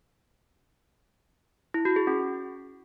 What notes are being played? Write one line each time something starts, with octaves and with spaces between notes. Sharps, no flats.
E4
F#4
G#4
C#4